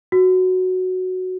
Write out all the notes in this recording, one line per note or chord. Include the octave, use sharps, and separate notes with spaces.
F#4